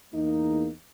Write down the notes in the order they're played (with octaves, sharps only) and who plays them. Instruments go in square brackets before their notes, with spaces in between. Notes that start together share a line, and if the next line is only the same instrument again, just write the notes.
[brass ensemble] E2 A#3 D#4